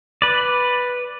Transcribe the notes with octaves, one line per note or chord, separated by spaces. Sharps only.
B4 D5